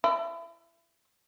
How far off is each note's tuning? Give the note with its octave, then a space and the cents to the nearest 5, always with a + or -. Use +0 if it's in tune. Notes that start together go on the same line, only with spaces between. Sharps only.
E4 +30